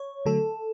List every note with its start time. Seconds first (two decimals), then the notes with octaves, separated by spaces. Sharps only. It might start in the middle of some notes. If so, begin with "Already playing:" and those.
Already playing: C#5
0.26 D3 F#3 A3 A4